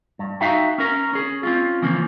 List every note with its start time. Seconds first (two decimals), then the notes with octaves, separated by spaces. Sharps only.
0.19 G2
0.41 D#4 F#4 E5 F5 G5
0.78 C#4 A#4
1.13 C#4 G#4
1.43 C4 C#4 F4
1.82 C#3 E3 F3 A#3